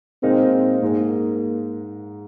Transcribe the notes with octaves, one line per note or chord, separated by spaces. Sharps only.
A#2 G#3 C4 D#4 A#4
G#2 G#3 A#3 D#4